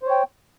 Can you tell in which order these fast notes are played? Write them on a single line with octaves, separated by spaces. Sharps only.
C5 C#5 G5